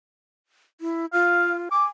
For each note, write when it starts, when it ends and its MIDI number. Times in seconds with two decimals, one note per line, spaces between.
0.81 1.06 64
1.13 1.69 65
1.13 1.53 77
1.71 1.89 80
1.71 1.85 86